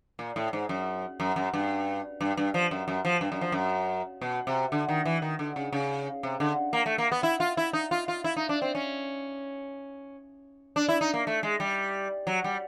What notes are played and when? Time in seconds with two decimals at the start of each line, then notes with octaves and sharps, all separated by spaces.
0.19 A#2
0.36 A2
0.53 G#2
0.69 F#2
1.20 F#2
1.36 F#2
1.53 G2
2.21 G2
2.37 G2
2.54 F3
2.71 F#2
2.88 F#2
3.05 F3
3.21 G2
3.32 F#2
3.41 F3
3.52 F#2
4.21 B2
4.47 C3
4.72 D3
4.89 D#3
5.05 E3
5.22 D#3
5.39 D3
5.56 C#3
5.72 C#3
6.23 C3
6.40 D3
6.73 A#3
6.86 A3
6.98 A#3
7.12 B3
7.23 E4
7.40 F4
7.57 E4
7.73 D#4
7.91 F4
8.08 F4
8.24 E4
8.36 D#4
8.49 D4
8.62 C4
8.75 C#4
10.76 D4
10.89 E4
11.01 D#4
11.14 A#3
11.27 A3
11.43 G#3
11.60 G3
12.27 F#3
12.44 G3